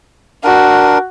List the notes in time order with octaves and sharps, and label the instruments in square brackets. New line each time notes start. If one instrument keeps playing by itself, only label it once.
[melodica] D4 A#4 [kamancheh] F#4